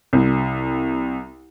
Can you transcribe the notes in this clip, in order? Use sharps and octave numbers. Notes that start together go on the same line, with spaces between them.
C2